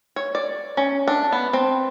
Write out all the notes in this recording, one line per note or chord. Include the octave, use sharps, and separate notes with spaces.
C#5
D5
C#4
D4
B3
C4